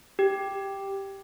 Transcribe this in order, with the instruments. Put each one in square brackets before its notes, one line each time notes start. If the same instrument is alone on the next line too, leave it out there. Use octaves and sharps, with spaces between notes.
[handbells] G4